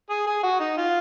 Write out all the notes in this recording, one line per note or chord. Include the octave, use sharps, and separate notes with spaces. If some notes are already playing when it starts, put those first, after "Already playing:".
G#4
G#4
F#4
D#4
F4